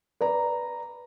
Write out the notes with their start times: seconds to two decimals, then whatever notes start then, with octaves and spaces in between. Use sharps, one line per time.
0.21 B4 D5 A#5